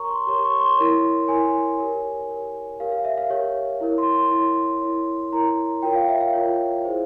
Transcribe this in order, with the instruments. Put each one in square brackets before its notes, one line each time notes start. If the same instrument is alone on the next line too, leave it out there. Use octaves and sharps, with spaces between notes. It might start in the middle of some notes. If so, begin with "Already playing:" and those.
Already playing: [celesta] G4 A#4 C#5 A#5 C#6
C6
G4 A#4 C#5 C6
C#6
C6
E4 A#4 C#5
E4 A#4 C#5 G#5
G4 A#4 C#5
G4 A#4 C#5
G4 A#4 C#5 F5
F5
E5
F5
G4 A#4 C#5
E4 A#4 C#5
C6
C6
E4 A#4 C#5 C6
E4 A#4 C#5
E4 A#4 C#5 A#5
F4 A#4 C#5 G5
F5
E5
F5
F4 A#4 C#5
E4 G#4 C5